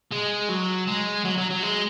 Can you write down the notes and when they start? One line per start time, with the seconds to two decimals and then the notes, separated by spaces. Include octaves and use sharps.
0.12 G#3
0.50 F#3
0.87 G#3
1.25 F#3
1.38 F#3
1.50 F#3
1.63 G#3